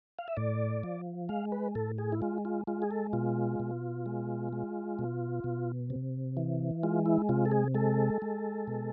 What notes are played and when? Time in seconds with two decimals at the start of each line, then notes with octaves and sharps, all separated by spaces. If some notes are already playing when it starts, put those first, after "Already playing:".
0.19 F5
0.28 E5
0.37 A2 D5
0.83 F3
1.29 G#3 F5
1.52 B4
1.75 A2 A4
1.98 G#4
2.12 E4
2.22 G#3 F4
2.45 F4
2.67 G#3 F4
2.82 G#4
2.91 A4
3.13 B2 F4
3.60 B2
4.06 G#3
4.53 G#3
4.99 B2
5.44 B2
5.90 C3
6.37 E3
6.83 G#3 F4
7.06 E4
7.29 C3 F4
7.45 A4
7.51 G#4
7.75 G#3 A4
8.22 G#3
8.68 B2